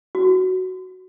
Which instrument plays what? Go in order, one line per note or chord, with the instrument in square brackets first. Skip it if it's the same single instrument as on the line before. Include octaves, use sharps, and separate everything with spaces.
[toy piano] F#4